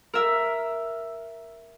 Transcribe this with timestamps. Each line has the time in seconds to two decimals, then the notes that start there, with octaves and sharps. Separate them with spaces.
0.14 A#4 E5